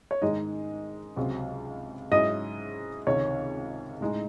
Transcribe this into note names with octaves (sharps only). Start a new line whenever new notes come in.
C#5
G#2 D#3 G#3 D#4 D#5
C#2 C3 F#3 C4
G#2 F#3 C#4 E4 D#5
C#2 C3 D#3 C#5
A2 G#3 D#4 D#5